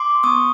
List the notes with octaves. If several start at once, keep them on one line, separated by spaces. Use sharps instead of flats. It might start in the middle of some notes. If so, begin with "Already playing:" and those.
Already playing: C6 D6
B3 C#6 D#6